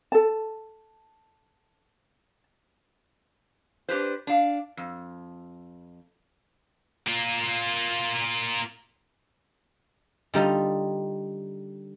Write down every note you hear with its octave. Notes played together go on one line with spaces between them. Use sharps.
A4 A5
D4 G4 B4 C5
D4 F5
F2
A#3 F4
D3 G3 D#4 F4